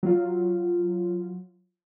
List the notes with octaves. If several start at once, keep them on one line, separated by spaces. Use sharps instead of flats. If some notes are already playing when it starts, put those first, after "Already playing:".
F#3 F4